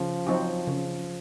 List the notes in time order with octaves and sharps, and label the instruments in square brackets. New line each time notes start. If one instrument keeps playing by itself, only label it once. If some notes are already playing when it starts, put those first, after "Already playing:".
Already playing: [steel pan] C#3 [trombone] F3
[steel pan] F#3 C4 D#4 F#4
C#3